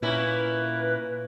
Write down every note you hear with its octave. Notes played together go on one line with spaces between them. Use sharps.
A#2 A#3 C#4 E4 B4